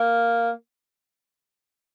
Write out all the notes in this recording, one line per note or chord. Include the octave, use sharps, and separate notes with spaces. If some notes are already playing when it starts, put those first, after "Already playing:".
Already playing: A#3